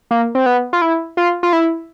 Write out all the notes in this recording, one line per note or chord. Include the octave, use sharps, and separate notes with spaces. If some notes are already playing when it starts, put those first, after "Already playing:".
A#3
C4
B3
F4
E4
F4
F4
E4